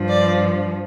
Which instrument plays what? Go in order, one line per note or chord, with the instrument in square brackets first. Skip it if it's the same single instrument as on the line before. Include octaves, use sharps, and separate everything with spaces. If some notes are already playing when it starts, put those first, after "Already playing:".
Already playing: [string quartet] G2 F3
D5